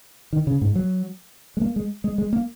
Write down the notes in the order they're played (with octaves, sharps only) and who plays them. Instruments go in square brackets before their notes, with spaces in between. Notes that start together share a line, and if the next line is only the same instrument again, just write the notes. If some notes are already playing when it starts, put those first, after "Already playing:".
[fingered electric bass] D#3
C#3
G#2
F#3
G#3
A#3
G#3
G#3
G#3
A#3